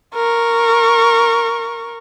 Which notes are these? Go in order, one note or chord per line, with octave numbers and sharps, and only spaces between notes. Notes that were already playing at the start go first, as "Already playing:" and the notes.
A#4 C#6